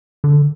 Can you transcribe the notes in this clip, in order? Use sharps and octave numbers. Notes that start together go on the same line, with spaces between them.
D3